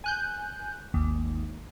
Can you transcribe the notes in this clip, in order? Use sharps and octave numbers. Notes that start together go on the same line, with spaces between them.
G#5 F#6 G6
G#1 D#2